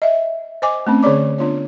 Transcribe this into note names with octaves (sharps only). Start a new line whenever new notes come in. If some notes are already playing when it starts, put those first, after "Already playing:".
D#5 E5
C5 D#5 G#5 D6
A3 C4 C#4
D3 G#4 C#5 D5 D6
B3 D4 F4 C#5